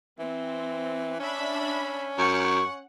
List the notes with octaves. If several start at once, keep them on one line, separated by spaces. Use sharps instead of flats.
E3 C4
C#4 D4 E5 B5
F#2 F#5 C#6